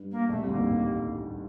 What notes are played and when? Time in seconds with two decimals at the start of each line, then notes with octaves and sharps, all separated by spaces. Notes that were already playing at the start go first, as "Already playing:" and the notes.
Already playing: G2
0.12 A#3
0.29 A#1 A#2 A3
0.39 C2 C3
0.48 D2 D3 A#3
0.57 D#2 D#3
0.67 A1 A2